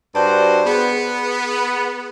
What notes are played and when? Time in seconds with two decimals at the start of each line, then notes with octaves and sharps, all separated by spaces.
0.15 G2 F#4 C5 D5 A5
0.65 B3 G#4